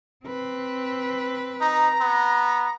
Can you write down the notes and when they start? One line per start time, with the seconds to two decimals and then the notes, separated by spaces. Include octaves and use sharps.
0.25 C4 B4
1.60 D#4 A#5
2.01 B3